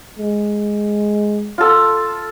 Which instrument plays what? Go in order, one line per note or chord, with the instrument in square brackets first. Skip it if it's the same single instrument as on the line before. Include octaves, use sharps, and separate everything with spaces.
[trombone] G#3
[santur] F4 A4